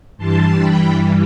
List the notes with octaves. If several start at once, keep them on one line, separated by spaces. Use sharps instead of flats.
G2 E3 G3 A5 C6
G5 B5